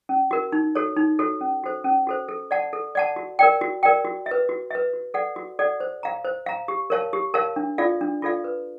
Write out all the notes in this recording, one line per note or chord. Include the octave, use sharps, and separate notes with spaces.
C#4
F#4 A#4
D#4
F#4 A4 C#5
D#4
F#4 A4 C#5
C#4
F#4 A4 C5
C#4
F#4 A4 C5
A4
D5 F#5 A5
A4
D5 F#5 A5
F#4
A#4 D5 G5
F#4
A#4 D5 G5
F#4
E5
B4
F#4
B4 E5
F#4
A4 D5 F#5
F#4
A4 D5 F#5
C5
F5 A#5
C5
F5 A#5
G4
A#4 C#5 F5 A5
G4
A#4 C#5 F5 A5
D4
F4 A4 D5 F5
D4
F4 A4 D5 F5
B4